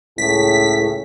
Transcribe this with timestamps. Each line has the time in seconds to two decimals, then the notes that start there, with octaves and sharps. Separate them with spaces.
0.18 C#2 A2 G#4 B6